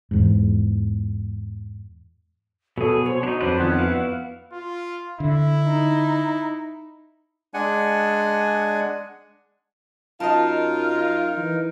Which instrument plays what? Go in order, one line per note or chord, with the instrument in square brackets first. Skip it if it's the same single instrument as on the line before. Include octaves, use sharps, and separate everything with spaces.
[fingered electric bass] E2 G#2
[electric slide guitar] B2 [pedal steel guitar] F#3 G#4 [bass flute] A4
[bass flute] C5 [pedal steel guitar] C#5
[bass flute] F#3 [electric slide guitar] D4 D#4
[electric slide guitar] F2 D4 [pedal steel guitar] B4 [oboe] C5
[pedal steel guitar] D#3 B3 C#4 [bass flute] F4 [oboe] F#5
[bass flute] B3 [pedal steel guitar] E4 F#4 F5
[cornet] F4
[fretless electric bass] D3 [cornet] E4
[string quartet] D#4
[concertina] G#3 D4 F#5 G#5
[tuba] F#2 [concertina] D#4 A#4 [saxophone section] F4 [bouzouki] D#5 A5
[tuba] E3